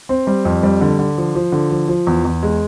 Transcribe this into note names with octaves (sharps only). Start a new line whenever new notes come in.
C4
G3
F2
G3
D3
D3
F3
F3
D3
F3
F3
E2
E2
G#3